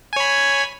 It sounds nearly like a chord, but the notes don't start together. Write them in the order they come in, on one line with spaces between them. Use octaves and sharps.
G#5 C#5 B5